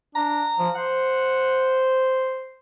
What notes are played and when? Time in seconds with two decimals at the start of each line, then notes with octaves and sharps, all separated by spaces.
0.15 D4 A#5
0.59 F3
0.75 C5 F#5